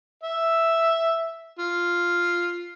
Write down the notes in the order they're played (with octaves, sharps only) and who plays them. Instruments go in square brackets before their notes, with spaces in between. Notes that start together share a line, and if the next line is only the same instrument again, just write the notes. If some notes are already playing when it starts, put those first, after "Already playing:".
[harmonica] E5
F4